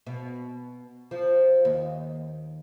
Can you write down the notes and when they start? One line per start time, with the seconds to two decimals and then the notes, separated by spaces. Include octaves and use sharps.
0.07 B2
1.11 F3
1.65 D#2